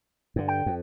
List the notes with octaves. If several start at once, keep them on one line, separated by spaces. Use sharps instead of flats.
G2 D3
G5
F2